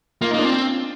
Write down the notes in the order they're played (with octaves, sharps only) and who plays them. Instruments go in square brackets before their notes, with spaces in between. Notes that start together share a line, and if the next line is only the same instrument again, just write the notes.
[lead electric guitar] A#3 [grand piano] F4
[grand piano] D#4
[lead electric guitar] A#3 [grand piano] D4 F4
[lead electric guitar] C4